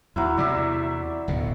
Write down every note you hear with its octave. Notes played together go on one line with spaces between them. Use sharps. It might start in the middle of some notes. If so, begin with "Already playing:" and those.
D#2 F#3 E4
E2 C3 D5 E5
D1 B2